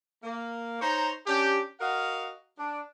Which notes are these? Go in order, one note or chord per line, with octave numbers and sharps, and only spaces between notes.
A#3
D#4 C5 C#5 A#5
C#4 D4 G4
F#4 A#4 D#5 F5 F#5
D4